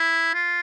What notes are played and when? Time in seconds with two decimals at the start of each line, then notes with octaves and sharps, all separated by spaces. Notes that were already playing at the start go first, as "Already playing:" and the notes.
Already playing: E4
0.34 F4